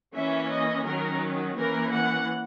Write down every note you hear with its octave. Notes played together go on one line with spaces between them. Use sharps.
E3 A#3 C#4 E5
D#5
D#3 F#3 C#4 A#4
E3 A#3 C#4 A#4
F#5